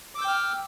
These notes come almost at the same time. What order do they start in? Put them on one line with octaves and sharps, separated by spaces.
D6 E6 G6 G5 F6